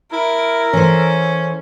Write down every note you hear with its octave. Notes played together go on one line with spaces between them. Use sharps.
E4 A#4
E3 C#4 A4 C5